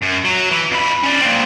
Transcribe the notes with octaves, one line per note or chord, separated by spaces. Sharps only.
F#2
F#3
E3
F2 B5
C#4 D5
A#3 C4